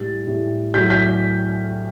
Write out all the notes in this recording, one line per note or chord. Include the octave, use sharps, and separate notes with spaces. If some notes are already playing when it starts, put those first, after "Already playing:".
Already playing: A2 G3 A6
A2 G3
A2 F#3 G6 B6
G6 B6